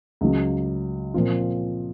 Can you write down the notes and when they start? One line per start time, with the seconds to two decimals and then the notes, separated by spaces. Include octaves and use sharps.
0.21 C#2 C#3 F#3
1.14 A#2 F3 C4 F4